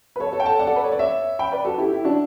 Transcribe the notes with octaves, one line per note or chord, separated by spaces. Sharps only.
B4
A4 C#5
A4 C#5
G5
F#5 A5
D5 F#5
A4
B4
C#5
D5
C#5 E5
G5 B5
B4 D5
F#4 A4
E4 G4
E4
D4 F#4